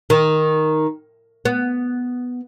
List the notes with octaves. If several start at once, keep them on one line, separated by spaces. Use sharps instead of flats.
D#3
B3